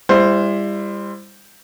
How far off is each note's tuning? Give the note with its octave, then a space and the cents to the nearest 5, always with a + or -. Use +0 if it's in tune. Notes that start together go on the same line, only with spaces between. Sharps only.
G3 +35 E4 +25 C5 +0